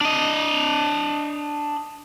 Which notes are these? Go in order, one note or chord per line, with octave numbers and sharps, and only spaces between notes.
D4 D#5